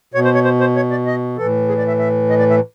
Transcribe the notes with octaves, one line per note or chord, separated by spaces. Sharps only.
B2 C#5
C5
C#5
C5
C5
C#5
D5
D#5
A2 E3 A4
G#4
D5
E5
E5
D#5
D5
E5